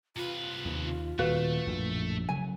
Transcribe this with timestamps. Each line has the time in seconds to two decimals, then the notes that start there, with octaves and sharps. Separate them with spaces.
0.16 C3 F4 B4
0.65 D#2
1.19 D#1 A3 F#4 B4 F5
1.67 A#1 F#2 A2
2.29 C#3 F#3 G#5